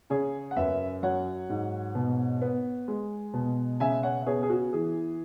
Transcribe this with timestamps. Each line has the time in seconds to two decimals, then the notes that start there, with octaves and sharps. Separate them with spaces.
0.10 C#3 G#4 C#5
0.51 F#5
0.57 F#2 B4 E5
1.03 F#3 C#5 F#5
1.49 G#2
1.95 B2
2.41 B3
2.88 G#3
3.33 B2
3.80 C#3 E5 G#5
4.03 C#5 F#5
4.22 E5
4.26 B3 G#4 C#5
4.43 G#4
4.50 F#4
4.73 E3 G#4